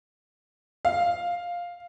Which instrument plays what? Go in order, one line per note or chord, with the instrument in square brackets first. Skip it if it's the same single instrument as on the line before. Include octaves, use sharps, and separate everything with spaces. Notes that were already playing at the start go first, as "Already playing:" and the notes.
[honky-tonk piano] F5